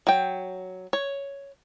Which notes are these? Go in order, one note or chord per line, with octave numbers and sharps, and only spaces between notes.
F#3 G5
C#5